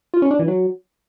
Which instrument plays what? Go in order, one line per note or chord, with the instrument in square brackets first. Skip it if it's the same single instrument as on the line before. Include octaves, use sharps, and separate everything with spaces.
[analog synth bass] F4
C#4
D4
E3
F#3